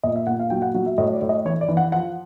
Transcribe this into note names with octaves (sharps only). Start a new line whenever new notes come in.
A#2 D#5
E5
A#2 F#5
F5
F#3 G5
F#5
F#3 F#5
E5
A2 D#5
D5
A2
D#5
E3 C#5
D5
E3
F#5
F3 F#5